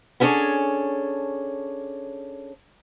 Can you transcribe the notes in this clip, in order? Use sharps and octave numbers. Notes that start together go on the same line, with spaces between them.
B3 C#4 D4 G#4 A4 C#5